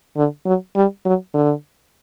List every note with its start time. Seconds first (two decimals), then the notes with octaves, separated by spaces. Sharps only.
0.16 D3
0.46 F#3
0.76 G3
1.05 F#3
1.34 D3